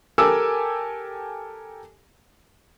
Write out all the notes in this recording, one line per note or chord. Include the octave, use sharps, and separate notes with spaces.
G4 A4 A#4 G#5 D6 E6